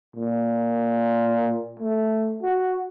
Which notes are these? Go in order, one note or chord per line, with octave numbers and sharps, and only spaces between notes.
A#2
A3
F#4